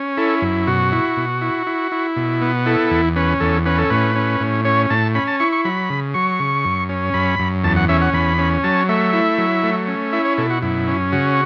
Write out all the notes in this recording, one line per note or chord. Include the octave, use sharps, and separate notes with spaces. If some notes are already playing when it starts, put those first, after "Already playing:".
Already playing: C#4
E4 A4
F#2
B2 F#4
E4
B2
E4
E4
E4
B2
B3
E4 A4
E2
C#4 B4
E2 A4
C#4 B4
A4
A2 B4
C#4
A2
C#4 C#5
A2 A5
C#4 B5
A5
E4 C#6
C#6
F#3 B5
C#3
F#3 C#6
C#3
F#2
C#4
F#2 B5
F#2
E2 A5
F#5
C#4 E5
F#5
E2 B5
C#4
F#3 A5
A3 E5
E4
F#3
A3
C#4
E4 E5
C#5
B2 A4
F#4
F#2 E4
C#4
C#3 F#4